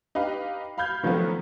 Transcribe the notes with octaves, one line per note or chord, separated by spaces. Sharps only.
D#4 G4 B4 F5
F5 B5 F6 G6 G#6
D#3 F3 F#3 A3 B3 C4